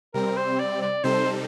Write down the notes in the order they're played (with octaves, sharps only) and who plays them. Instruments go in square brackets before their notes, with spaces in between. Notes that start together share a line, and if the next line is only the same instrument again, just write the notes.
[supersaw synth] C3 G3 C4 [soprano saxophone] A#4
[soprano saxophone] C5
D5
D5
[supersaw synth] C3 G3 C4 D#4 A4 [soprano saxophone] C5